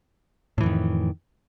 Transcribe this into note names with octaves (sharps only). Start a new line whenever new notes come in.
F2 A2 D#3 E3